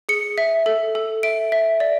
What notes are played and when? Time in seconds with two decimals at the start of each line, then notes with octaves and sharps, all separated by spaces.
0.09 G#4 C#7
0.38 E5
0.66 A4
0.95 A4
1.23 E5 D7
1.52 E5
1.80 D5